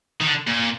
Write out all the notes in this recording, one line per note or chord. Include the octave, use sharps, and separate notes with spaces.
D#3
D3
A#2